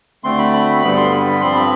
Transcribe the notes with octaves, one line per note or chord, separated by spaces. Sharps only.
D2 D3 A3 C4 C6
B5
B5
G2 D3 G3 B3 B5
C6
B5
G2 F3 C4 C6
B5